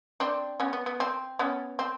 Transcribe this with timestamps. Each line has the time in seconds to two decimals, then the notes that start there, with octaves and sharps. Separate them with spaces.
0.20 C4 D4
0.60 B3 C#4
0.73 B3
0.86 B3
1.00 C4
1.39 B3 C#4
1.79 C4